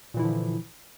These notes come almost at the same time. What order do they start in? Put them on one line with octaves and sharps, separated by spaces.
A#2 E3 E4 D3 F3